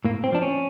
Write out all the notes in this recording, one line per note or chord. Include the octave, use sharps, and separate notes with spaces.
A2 A#3
C4
F3 D4
C#4